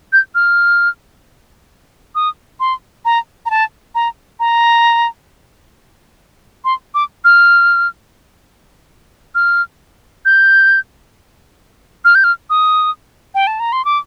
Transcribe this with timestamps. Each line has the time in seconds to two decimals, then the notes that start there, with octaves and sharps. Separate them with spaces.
0.13 G6
0.35 F6
2.15 D#6
2.60 C6
3.05 A#5
3.46 A#5
3.50 A5
3.95 A#5
4.40 A#5
6.65 C6
6.95 D6
7.25 F6
9.35 F6
10.25 G6
12.05 F6
12.15 G6
12.24 F6
12.50 D#6
13.35 G5
13.47 A5
13.60 A#5
13.72 C6
13.85 D6